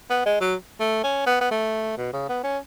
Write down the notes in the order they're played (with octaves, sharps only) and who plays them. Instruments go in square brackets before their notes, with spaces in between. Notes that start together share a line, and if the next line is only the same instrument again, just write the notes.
[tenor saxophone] B3
G#3
F#3
A3
C#4
B3
B3
A3
B2
C#3
B3
C#4